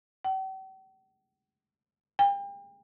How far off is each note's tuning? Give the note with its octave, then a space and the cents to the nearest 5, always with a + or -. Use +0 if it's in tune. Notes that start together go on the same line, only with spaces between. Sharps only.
G5 -45
G5 +35